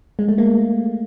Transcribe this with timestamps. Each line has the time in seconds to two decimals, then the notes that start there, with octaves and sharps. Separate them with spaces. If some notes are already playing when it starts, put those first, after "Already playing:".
0.19 G#3
0.28 A3
0.38 A#3